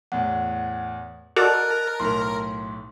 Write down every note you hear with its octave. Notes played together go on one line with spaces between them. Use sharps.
E2 A2 F#5
F#4 A4 A#4 D5 D#5 A5 F#6 A6
B1 A2 A3 C6